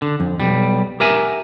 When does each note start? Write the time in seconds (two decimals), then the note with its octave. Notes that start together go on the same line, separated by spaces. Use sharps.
0.02 D3
0.20 F2
0.40 B1 G3
1.00 G4 A#4 E5 G#5